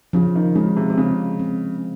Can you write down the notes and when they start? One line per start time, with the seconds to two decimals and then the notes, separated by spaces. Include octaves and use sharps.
0.13 C#3 F3
0.35 D#3
0.55 C#3 G#3
0.77 C3
0.90 C3
0.97 C#3 C4
1.40 C4